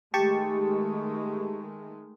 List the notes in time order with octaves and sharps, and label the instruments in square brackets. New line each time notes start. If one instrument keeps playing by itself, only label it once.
[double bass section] D#3 G#3 A3 [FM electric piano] G4 A5 C#6